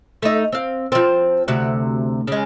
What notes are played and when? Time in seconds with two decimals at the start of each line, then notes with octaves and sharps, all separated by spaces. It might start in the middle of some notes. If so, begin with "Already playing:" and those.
0.22 A3 D#4
0.52 C4 F5
0.92 F3 C4
1.48 D2 C3 F#4
2.27 C#3 G#3